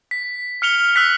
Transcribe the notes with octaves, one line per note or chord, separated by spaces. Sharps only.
B6
F6 C#7 F7 G7
E6 F#6 B6 C#7